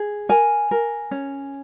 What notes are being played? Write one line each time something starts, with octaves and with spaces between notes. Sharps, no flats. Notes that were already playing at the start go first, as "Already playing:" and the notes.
Already playing: G#4
A#4 G#5
A#4
C#4